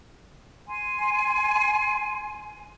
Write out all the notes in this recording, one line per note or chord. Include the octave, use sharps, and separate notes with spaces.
G#5 C6